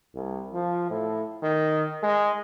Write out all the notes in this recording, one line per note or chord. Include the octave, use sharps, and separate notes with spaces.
C2
F3
A2
D#3
G#3